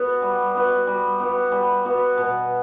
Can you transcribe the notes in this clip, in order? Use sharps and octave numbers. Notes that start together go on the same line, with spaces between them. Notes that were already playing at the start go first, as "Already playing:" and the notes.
Already playing: B3 F#4
G3
B3 F#4
G3
B3 F#4
G3
B3 F#4
B2